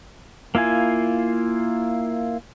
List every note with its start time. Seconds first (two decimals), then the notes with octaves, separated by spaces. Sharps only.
0.55 A#3 E4 F4 G#5